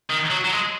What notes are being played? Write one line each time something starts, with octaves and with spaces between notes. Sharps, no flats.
D#3
F#3
F#3
G#3